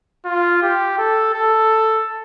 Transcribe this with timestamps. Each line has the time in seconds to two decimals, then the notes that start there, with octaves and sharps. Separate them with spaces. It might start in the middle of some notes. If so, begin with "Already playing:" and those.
0.25 F4
0.62 G4
0.98 A4
1.34 A4